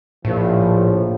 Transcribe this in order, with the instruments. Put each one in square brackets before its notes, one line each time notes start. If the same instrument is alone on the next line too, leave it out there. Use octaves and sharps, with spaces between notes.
[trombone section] A#1 F3 [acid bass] A2